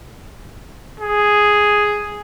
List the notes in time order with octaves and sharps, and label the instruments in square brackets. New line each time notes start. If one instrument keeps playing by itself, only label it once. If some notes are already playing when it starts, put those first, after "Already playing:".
[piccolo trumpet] G#4